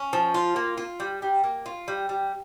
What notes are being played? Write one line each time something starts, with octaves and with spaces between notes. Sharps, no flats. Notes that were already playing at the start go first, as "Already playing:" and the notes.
Already playing: C#4
F3
F4
A#3
F4
G3
G3
A#3
F4
G3
G3